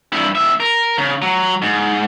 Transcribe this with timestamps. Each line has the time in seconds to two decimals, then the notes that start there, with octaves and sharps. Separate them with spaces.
0.13 G2 E4
0.35 D#2 E5
0.60 A#4
0.98 C#3
1.22 F#3
1.62 G#2